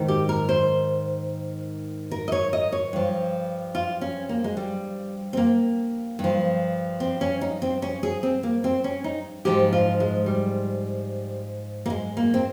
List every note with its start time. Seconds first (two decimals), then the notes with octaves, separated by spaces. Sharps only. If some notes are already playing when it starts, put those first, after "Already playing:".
Already playing: G#2 D#3
0.08 G4
0.29 A#4
0.49 C5
2.11 A#4
2.28 D#5
2.32 C#5
2.53 D#5
2.72 C#5
2.93 G2 F3
3.75 F4
4.01 C#4
4.29 A#3
4.44 G#3
4.57 G3
5.33 C4
5.37 A#3
6.19 G2
6.24 F3
7.00 C4
7.21 C#4
7.41 D#4
7.62 C4
7.82 C#4
8.03 G#4
8.23 C4
8.43 A#3
8.64 C4
8.84 C#4
9.04 D#4
9.45 G#2 F3 G4
9.73 F4
10.00 G#3
10.26 G3
11.86 A#3
11.90 G#3
12.17 A#3
12.34 C4